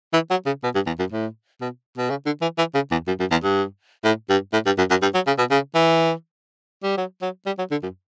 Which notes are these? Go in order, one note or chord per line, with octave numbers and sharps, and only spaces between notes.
E3
F#3
C#3
B2
G2
E2
F#2
A2
B2
B2
C#3
D3
E3
E3
C#3
E2
F#2
F#2
E2
G2
A2
G2
A2
G2
F#2
F#2
G2
F#3
C#3
B2
C#3
E3
G3
F#3
F#3
G3
F#3
D3
F#2